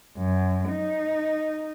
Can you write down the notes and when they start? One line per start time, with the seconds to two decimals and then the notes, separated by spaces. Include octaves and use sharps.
0.18 F#2
0.70 D#4